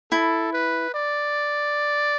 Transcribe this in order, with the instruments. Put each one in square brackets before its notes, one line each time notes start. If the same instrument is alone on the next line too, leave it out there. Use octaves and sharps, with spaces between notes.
[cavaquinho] E4 [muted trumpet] A4
[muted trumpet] B4
D5